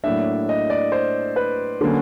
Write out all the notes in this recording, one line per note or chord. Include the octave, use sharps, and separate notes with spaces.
A2 F#3 A#3 D4 E5
D#5
D5
C5
B4
D3 F#3 A#3 C#4